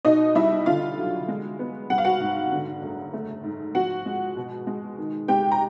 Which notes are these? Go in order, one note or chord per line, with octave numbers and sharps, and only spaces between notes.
B2 D#4 D#5
G3 E4 E5
D3 F4 F5
F#3
G#3
B3
G3 F#5
F5
F#4 F#5
G#2
D3
F#1
A3
G#2
F3 F#4 F#5
G#3
B2
G#3
D#3
G#3 G4 G5
A#5